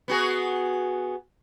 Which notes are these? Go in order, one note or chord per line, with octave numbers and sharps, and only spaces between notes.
B3 F#4 G#4